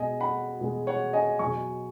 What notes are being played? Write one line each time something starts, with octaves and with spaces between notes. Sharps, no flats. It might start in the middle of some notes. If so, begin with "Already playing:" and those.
Already playing: B2 G#3 D#5 G#5
F#5 B5
B2 G#3
C#5 F#5
D#5 G#5
B2 F#3 G#5 C#6